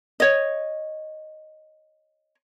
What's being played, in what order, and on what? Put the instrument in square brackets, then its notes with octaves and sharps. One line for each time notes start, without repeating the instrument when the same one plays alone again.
[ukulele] C#5 D#5